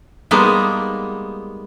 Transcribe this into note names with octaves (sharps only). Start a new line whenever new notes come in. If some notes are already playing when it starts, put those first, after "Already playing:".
G3 G#3 A#3 B3 D#4